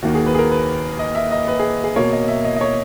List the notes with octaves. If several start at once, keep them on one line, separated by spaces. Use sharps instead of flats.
D#2 D#3 A#3 F#4
G#4
B4
G#4
A#4
B4
D#5
E5
D#5
B4
G#4
G#4
B2 A#3 C#5
D#5
E5
D#5
D#5
C#5